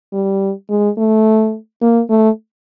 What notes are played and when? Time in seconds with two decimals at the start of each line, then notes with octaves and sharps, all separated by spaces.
0.13 G3
0.69 G#3
0.97 A3
1.82 A#3
2.10 A3